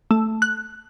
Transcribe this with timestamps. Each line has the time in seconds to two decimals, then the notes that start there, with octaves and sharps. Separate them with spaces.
0.11 A3
0.42 F#6